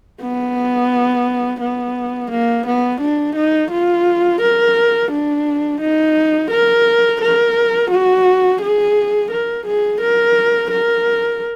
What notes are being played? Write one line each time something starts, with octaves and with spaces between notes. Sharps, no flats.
B3
B3
A#3
B3
D4
D#4
F4
A#4
D4
D#4
A#4
A#4
F#4
G#4
A#4
G#4
A#4
A#4